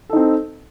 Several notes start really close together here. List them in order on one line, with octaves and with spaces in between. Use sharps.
A4 D#4 C4